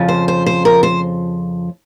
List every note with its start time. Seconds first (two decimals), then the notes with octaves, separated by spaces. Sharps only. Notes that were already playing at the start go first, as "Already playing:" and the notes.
Already playing: F2 C#3 F3
0.08 C5
0.28 C5
0.46 C5
0.65 A#4
0.83 C5